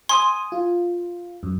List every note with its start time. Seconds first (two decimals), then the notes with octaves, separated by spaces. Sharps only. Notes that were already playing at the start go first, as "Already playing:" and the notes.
0.09 G#5 C6 D#6
0.52 F4
1.43 F#2